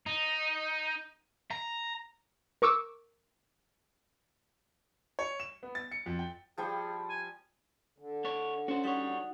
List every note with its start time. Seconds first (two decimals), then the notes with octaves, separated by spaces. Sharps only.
0.06 D#4
1.51 A#5
2.62 A#4 C#6 D6 E6
5.19 C#5
5.40 E7
5.63 B3
5.75 A6
5.91 C#7
6.06 F2
6.19 G5
6.58 F3 G3 G#4 G5
7.10 G#5
7.98 D3
8.25 D4 C#5
8.68 C#4 F#4 C5
8.84 G3 D#4 F#4 C#5 F#5